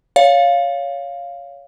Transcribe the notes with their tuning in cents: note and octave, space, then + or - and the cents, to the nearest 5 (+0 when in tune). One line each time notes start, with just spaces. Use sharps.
C#5 +15 F5 +0